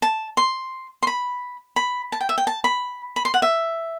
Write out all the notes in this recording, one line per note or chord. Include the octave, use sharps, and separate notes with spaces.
A5
C6
C6
B5
B5
A5
G5
E5
G5
A5
B5
B5
C6
F#5
E5